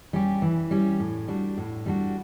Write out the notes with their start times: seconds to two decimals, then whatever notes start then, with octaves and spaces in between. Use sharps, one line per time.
0.13 G3 C#4 G4
0.42 E3
0.71 G3 C#4 G4
1.00 A2
1.28 G3 D4 F#4
1.58 A2
1.86 G3 D4 F#4